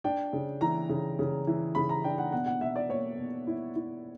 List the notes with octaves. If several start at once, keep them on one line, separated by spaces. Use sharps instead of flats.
D4 G5
C#3
E3 A#5
C#3
C#3
E3
C#3 B5
A#5
D4 G5
F#5
B2 F#5
F#5
B2 E5
D5
A#3 C#5
B2
E4
E4